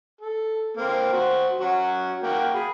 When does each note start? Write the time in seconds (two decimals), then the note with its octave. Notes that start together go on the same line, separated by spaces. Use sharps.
0.21 A4
0.77 A#3 C4
1.13 F#4 C5
1.60 F#3 C#4 F#4
2.23 A#3 F#4 G5
2.54 G#4 B5